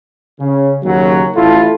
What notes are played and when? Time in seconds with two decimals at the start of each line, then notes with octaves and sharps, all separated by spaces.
0.40 C#3
0.84 D#2 C#3 F#3
1.36 A1 E4 F4 A4